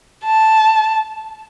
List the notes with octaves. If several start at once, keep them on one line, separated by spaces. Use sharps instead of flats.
A5